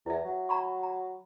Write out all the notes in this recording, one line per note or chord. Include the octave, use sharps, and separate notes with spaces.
E2 E4 E5
F#3
A#5 B5 C#6
A#5